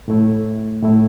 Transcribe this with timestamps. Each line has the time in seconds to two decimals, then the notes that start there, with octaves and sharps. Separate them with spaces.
0.08 A2 A3 E4
0.83 A2 A3 E4